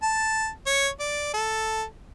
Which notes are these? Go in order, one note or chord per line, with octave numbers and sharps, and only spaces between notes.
A5
C#5
D5
A4